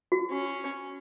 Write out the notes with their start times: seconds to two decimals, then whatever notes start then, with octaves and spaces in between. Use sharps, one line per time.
0.12 F#4
0.31 C#4 F#4